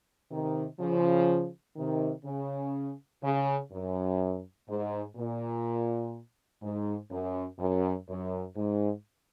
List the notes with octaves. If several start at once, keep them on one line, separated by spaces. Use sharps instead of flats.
C3 D#3
C#3 F3
C3 D#3
C#3
C#3
F#2
G#2
A#2
G#2
F#2
F#2
F#2
G#2